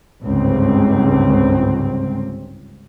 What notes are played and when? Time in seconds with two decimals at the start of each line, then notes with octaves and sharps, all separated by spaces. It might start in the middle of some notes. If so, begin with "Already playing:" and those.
0.21 G1 C#2 G#2 C4